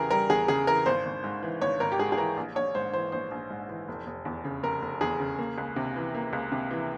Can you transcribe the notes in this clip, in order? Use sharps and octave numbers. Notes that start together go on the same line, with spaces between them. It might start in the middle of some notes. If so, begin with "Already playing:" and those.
Already playing: E2 C#3 E3 G4 G#4 A#4
G3 A#4
E2 G#4
C#3 G#4
E3 A#4
G#1 C5
G#1
G#2
E3
G#1 C#5
G#1 A#4
G4
G#2 G#4
G#4
E3 A#4
A#1
A#1 C#5
G#2 C5
E3 C5
A#1 C5
A#1
G#2
E3
F1
F1
E2
C#3
F1 A#4
F1
E2 G#4
C#3
A#3
C#2
C3
E3
A#3
C#2
C3
E3